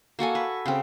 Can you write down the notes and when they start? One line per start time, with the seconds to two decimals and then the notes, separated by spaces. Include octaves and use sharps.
0.19 A#3 F#4 A4 G#5
0.35 B4
0.66 C#3 C4